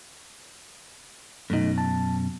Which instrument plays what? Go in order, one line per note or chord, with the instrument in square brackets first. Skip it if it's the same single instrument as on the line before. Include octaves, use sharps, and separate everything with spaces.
[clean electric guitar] F#2 B2 [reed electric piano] A3 D#4
[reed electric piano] A5